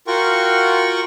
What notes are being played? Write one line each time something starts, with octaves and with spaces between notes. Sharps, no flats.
F4 F#4 A#4 F#5 G5 C#6